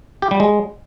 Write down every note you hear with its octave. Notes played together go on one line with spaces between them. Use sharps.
G4
G3
G#3